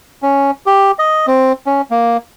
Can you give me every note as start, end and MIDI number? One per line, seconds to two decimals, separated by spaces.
0.23 0.51 61
0.66 0.91 67
0.99 1.26 75
1.27 1.52 60
1.66 1.81 61
1.91 2.17 58